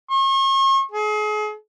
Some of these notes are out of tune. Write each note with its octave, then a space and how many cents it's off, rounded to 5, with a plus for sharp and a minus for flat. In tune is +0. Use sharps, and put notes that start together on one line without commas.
C#6 -40
G#4 +35